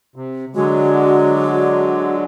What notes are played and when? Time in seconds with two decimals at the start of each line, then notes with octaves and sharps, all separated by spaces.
0.16 C3
0.55 D3 F#3 G#3 F#4